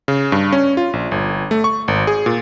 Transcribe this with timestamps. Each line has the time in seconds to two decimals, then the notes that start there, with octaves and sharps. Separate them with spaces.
0.08 C#3
0.32 G2
0.52 C#4
0.77 F4
0.93 A#1
1.12 G1
1.51 A3
1.64 C#6
1.88 G#1
2.07 G#4
2.26 A#2